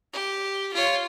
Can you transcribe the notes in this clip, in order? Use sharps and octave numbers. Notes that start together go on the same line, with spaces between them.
G4
F4 C#5